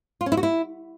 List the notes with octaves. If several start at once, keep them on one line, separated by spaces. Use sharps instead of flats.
F4
C#4
E4
F#4
E4